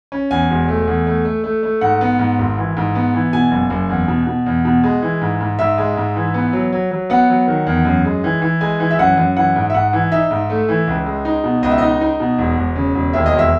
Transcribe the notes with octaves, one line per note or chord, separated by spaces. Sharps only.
C#4
E2 G#5
E1
A3
E2
A3
A3
A3
A3
G#2 F#5
B3
G#2
G#1
E3
G#2
B3
E3
B2 G#5
F#1
F#1
E2
B2
B2
E2
B2
G#3
E3
G#2
G#2
G#2 E5
G#3
G#2
E3
B3
F#3
F#3
F#3
B3 F#5
F#3
D#3
E2
F#2
G#3
E3
E3
G#3 G#5
E3
E5
F#2 F#5
F#2
E3 F#5
G#2
E5
G#2 F#5
E3
D#4 E5
G#2
A3
E3
C#2
G#3
D#4
B2
C#2 D#5
E5
D#4 D#5
D#4
B2
E1
E1
C#3
E1
D#2 E5
D#5
E1
E5